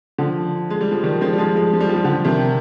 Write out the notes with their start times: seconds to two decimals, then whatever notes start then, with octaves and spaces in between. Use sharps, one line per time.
0.18 D3 F3
0.70 G#3
0.81 G3
0.91 F3
1.03 D#3 G3
1.21 F3 G#3
1.33 G3
1.38 F3 G#3
1.55 F3 G#3
1.73 F3
1.80 G3
1.89 F3
1.96 G3
2.04 D3 F3
2.25 C3 D#3